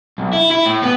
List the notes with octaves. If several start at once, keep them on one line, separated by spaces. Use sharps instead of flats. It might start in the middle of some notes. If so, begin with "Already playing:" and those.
B1
E4
E4
A2
B3